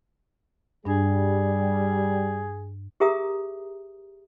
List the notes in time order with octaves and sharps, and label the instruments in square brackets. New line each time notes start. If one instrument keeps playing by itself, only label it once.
[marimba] G2 D4 [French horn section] G3 [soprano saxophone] G#4
[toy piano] G4 G#4 A#4 E5 A#5 D#6